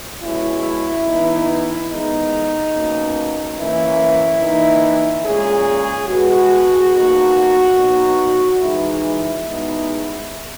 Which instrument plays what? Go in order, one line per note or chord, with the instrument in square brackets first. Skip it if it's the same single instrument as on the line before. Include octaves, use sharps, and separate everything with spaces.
[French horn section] B2 G#3 C#4 E4
E3 B3 D#4
D#3 G#3 B3 D#4
B2 A#3 C#4
E3 A#3 C#4 E4
E3 A#3 D#4
A#2 G#3 C#4 G#4
B2 G#3 B3 F#4
B2 A#3 D#4
B2 F#3 B3 D#4
E3 G#3 D#4 E4
B2 G#3 B3 D#4